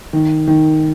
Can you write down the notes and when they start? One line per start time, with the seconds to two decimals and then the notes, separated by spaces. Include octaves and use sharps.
0.13 D#3
0.48 D#3